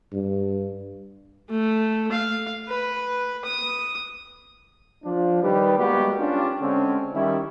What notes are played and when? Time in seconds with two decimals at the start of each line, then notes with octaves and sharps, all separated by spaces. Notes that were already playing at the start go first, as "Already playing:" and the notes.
0.13 G2
1.50 A3
2.12 F5
2.68 B4
3.45 D#6
5.04 F3 D4
5.42 D#3 G3 D#4 G4 B4
5.78 G3 G#3 A#3 B3 F#4 G4
6.19 C#4 D4 F4 G4
6.60 D3 G#3 C4 C#4
7.13 D#3 G3 C#4 E4